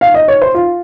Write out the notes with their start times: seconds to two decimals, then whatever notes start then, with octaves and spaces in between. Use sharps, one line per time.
0.01 F5
0.14 D#5
0.28 C#5
0.42 C5
0.54 F4